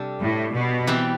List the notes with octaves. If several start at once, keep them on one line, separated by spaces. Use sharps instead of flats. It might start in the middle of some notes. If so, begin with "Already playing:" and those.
Already playing: C3 G3 D4 A4
A2
B2
E3 G3 C4 G4